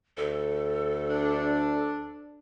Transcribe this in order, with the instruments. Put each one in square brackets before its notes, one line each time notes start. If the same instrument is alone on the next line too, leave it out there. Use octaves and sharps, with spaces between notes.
[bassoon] D2 [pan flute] A4
[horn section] D4